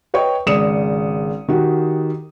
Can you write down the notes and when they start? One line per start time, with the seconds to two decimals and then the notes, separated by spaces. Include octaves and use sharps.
0.14 B4 C#5 D#5 G5 C#6
0.47 G#1 C#3 D5 D#6 C#7 E7
1.48 D#3 F#4 G4